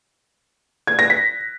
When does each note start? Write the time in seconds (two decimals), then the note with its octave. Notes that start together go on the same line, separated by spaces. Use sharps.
0.87 G#6
0.99 A#6
1.10 B6